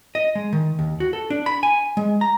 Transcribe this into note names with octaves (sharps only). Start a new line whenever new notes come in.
D#5
G#3
D#3
D#2
F#4
A4
D4
B5
G#5
G#3
A#5